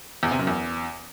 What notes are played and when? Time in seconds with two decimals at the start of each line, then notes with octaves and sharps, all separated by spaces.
0.23 E2
0.31 C3
0.39 F#2
0.47 E2